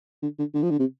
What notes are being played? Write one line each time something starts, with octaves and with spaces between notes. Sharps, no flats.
D3
D3
D3
F3
D3
C3